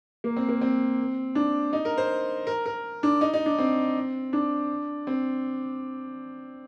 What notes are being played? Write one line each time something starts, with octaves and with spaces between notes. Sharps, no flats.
A#3
C4
A#3
C4
D4
D#4
A#4
C5
A#4
A#4
D4
D#4
D#4
D4
C4
D4
C4